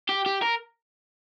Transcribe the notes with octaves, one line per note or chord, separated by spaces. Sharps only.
G4
G4
A#4